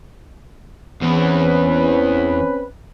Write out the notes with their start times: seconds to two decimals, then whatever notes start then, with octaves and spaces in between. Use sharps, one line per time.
1.02 E2 E3 C4 C#4 B4